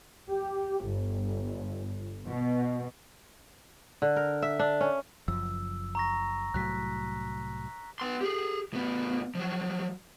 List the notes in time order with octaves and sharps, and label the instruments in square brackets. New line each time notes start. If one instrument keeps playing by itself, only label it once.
[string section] G4
G1
B2
[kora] D3
A#4
E5
D4
C#4
[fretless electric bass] F#1 F#2 F3 [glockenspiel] E6
[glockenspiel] A#5 C#6 A#6
[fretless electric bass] C2 A2 F#3 [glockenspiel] F#6 B6
[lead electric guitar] B3 C6
G4 G#4
A2 B3
F3 F#3